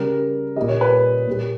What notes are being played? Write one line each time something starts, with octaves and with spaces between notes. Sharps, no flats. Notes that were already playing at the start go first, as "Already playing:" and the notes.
Already playing: C#3 G3 A#4
A#2 G3 D#5
C#5
B4
C#5
A#2 G3